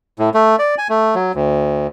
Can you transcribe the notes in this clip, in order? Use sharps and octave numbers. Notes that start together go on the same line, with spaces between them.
A2
A3
D5
G#5
A3
F#3
D2